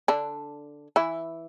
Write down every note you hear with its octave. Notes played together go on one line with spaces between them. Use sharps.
D3 D4
E3 E4